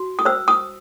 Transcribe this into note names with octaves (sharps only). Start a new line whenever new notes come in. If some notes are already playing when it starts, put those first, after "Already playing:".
Already playing: F#4
D#6
C5 E6
D#6